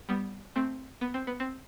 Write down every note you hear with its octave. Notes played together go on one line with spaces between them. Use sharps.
G3 B3
A3 C4
B3
C4
B3
C4